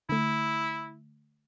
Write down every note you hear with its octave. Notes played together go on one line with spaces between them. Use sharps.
D3 A3 E4